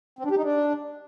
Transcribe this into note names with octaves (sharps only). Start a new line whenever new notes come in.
C4
D4
G4
D#4
D4